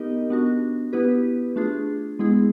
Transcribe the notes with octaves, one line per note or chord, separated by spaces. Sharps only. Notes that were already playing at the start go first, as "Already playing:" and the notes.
Already playing: B3 D#4 G4 A#4 D#5
B3 D4 F#4
B3 E4 G4 B4
A3 D4 F4 G#4
G#3 B3 E4 G#4